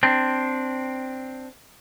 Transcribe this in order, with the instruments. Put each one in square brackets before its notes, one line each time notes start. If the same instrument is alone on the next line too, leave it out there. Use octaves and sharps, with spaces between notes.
[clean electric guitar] C4 D4